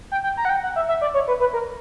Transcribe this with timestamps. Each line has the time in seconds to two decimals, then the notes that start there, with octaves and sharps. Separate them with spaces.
0.12 G5
0.24 G5
0.37 A#5
0.45 F#5
0.49 G5
0.63 F#5
0.76 E5
0.88 E5
1.01 D5
1.14 C#5
1.28 B4
1.40 B4
1.53 A#4